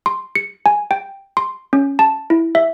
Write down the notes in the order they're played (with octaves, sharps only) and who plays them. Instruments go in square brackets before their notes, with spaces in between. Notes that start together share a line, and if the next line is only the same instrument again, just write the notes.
[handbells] C6
C#7
G#5
G5
C6
C#4
A5
E4
E5